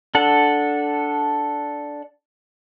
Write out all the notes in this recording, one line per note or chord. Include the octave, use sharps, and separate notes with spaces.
D4 A4 F#5